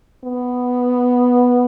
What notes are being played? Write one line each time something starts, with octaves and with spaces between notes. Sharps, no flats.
B3